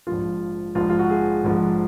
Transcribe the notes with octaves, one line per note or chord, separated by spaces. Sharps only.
A#1 G#2 F3 F4
A#1 G#2 F3 F4
F4
F#4
G#4
A#1 G#2 F3